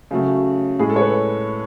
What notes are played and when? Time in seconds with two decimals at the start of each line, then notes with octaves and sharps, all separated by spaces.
0.11 C#3 F#3 A3
0.79 A2 G#3 G#4
0.90 A4
0.96 C#5
1.01 B4